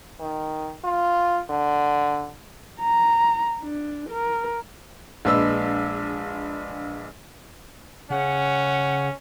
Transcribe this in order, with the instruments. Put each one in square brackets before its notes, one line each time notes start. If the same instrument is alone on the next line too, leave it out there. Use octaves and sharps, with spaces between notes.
[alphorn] D#3
F4
D3
[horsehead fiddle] A#5
D4
A#4
[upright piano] A#1 G#3 D4 B4 E6
[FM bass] C#3 [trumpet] C#4 [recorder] F#5